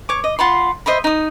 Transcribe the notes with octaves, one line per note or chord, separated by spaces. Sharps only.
C#5 D6
D#5
F4 F#5 B5 C6
C5 D#5 E5 B5
D#4 D#6